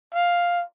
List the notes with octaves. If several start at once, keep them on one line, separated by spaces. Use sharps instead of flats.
F5